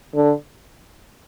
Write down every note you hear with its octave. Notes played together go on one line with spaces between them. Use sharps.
D3